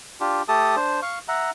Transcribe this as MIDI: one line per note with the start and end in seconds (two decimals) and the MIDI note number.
0.20 0.42 62
0.20 0.42 65
0.20 0.42 67
0.48 0.76 57
0.48 0.76 67
0.48 0.76 69
0.48 0.76 81
0.48 0.76 87
0.76 1.00 62
0.76 1.00 72
1.02 1.19 77
1.02 1.19 85
1.28 1.51 76
1.28 1.51 78
1.28 1.51 82